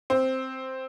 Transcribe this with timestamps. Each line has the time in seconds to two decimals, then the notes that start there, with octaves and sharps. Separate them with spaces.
0.10 C4